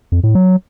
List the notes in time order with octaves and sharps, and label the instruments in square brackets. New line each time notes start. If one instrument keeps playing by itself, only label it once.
[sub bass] F2
A2
F#3